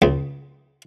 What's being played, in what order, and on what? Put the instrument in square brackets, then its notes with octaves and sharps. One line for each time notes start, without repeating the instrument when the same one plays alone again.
[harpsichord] C#2